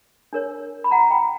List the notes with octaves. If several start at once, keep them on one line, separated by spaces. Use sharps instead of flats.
D4 A#4 C#5
B5
F#5 A#5
G5 B5